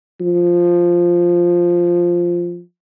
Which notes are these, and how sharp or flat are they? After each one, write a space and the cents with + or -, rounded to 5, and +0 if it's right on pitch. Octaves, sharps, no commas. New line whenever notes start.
F3 +0